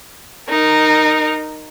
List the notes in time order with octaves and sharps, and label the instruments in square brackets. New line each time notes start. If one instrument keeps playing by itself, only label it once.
[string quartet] D#4 A#4